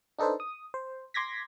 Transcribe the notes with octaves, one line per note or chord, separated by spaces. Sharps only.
D4 D#4 A4 B4 C5
D#6
C5
C6 D6 G#6 A#6 B6